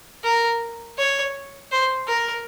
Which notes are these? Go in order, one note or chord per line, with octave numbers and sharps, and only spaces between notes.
A#4
C#5
C5
A#4